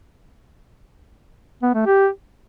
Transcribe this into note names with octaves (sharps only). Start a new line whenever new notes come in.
B3
A3
G4